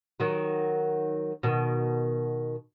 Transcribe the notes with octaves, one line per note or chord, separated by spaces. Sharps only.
D#3 F#3
B2 D#3